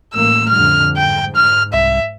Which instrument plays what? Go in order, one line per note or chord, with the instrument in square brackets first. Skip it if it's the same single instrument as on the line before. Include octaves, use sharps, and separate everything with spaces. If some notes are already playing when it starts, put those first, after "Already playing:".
[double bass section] A1 A#3 [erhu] E6
[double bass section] F2 D3 G3 [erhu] F6
[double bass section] G#2 [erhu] G5
[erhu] F6
[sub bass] C2 [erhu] E5